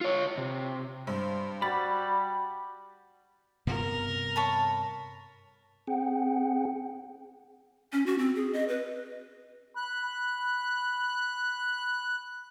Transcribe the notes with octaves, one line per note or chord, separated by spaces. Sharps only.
F4 C#5
C3
G2 C5
G3 F#4 B5 A6
G2 C3 B3 A#4
C#5 A5 B5
C4 G#4 F#5 G5
C#4
F#4
C4
G#4
D#5
B4
B5 F#6